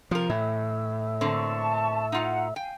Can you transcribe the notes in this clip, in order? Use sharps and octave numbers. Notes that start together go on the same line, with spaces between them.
C3 F3 A#4
A2 E3 E5
D3 A#3 C4 A5 C#6
D#4 F4 F#5 A#5
F5 G5 G#5